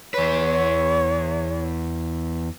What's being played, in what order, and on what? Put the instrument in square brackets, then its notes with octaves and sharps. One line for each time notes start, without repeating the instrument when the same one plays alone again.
[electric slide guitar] E2 B4 [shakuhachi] C#5